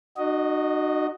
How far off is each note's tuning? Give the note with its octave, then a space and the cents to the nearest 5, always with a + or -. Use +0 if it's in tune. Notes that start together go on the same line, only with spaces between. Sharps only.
D#4 -45 F#4 +0 D#5 +0